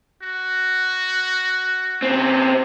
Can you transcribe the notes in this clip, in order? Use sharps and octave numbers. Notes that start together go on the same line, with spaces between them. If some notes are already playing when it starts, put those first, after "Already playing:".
F#4
C#3 C4